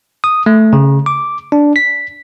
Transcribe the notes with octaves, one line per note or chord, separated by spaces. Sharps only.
D#6
A3
C#3
D6
D4
B6